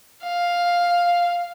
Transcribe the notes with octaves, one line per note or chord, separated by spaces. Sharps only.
F5